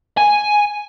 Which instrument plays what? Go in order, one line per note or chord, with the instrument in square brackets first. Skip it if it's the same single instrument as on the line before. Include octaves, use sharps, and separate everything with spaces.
[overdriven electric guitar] G#5